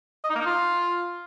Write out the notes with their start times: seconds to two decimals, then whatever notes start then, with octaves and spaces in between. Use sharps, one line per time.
0.24 D#5
0.30 D#4
0.35 A#3
0.40 D#4
0.46 F4